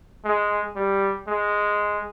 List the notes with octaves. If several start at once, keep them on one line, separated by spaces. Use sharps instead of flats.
G#3
G3
G#3